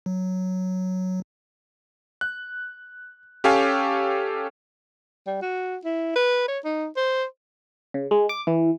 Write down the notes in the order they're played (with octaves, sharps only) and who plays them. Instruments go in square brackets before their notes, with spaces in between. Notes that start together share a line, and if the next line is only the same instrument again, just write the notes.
[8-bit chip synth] F#3
[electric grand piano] F#6
C#4 G4 A4 C#5 F5 G#5
[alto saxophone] G3
F#4
E4
B4
C#5
D#4
C5
[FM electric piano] C#3
G#3
D6
E3